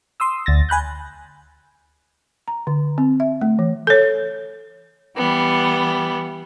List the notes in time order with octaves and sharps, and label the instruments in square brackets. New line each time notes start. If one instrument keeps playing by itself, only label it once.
[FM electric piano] C6 D#6 E6
D2 A6 A#6
G#5 B5 F#6 G6
[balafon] A#5
D3
C4
E5
A3
E3
A4 C#5
[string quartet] E3 G3 B3